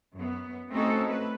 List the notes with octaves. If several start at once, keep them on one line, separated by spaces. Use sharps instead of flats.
F#2 B3
A3 C4 C#4 D#4 F#4 A4
A3 B4